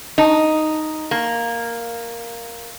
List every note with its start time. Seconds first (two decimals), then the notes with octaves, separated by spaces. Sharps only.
0.18 D#4
1.11 A#3